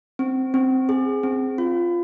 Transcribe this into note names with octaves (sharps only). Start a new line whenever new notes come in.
C4
C4
G#4
C4
F4